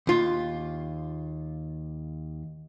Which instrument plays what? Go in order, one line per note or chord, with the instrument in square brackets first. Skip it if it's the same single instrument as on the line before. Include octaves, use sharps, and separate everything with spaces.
[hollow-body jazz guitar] D#2 F4